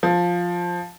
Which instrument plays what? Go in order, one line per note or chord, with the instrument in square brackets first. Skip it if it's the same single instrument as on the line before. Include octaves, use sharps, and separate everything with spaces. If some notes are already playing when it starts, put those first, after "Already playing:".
[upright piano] F3